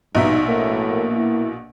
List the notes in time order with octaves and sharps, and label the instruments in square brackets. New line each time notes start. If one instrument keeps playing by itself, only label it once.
[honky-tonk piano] A#1 B2 E5 [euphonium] G2 [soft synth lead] D#4
[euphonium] A2 [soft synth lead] A#3
[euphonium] E4